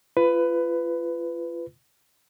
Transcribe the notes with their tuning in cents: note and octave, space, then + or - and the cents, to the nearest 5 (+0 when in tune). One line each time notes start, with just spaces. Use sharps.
F4 -30 B4 +15